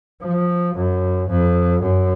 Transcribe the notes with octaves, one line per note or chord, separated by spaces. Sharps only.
F3
F#2
F2
F#2